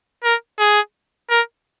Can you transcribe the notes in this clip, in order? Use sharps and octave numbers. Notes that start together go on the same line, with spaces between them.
A#4
G#4
A#4